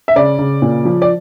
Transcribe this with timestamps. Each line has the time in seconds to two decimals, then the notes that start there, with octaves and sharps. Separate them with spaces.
0.08 E5
0.16 C#3 D5
0.39 C#3
0.62 A#2
0.85 F3
1.02 D5